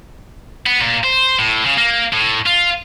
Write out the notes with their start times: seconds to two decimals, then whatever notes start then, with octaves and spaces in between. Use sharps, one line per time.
0.66 B3
0.81 A#2
1.04 C5
1.39 A2
1.65 C#3
1.78 A#3
2.13 A2
2.46 F4